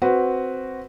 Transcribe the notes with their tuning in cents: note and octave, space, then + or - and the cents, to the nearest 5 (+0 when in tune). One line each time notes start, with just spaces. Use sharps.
C4 +0 F#4 +0 B4 +0